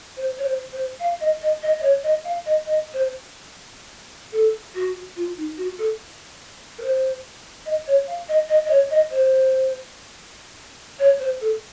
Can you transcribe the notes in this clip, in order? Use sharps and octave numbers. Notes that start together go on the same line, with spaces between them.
C5
C#5
C5
C5
F5
D#5
D#5
D#5
D#5
C#5
D#5
F5
D#5
D#5
C5
A4
F#4
F4
D#4
F#4
A4
A#4
C5
D#5
C#5
F5
D#5
D#5
D#5
C#5
D#5
C5
C#5
C5
A4